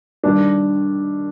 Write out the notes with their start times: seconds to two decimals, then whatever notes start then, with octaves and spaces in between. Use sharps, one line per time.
0.23 D#3 G3 D4